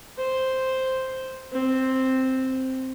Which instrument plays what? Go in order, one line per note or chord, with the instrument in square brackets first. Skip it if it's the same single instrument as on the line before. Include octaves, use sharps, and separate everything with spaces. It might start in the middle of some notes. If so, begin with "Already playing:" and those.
[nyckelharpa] C5
C4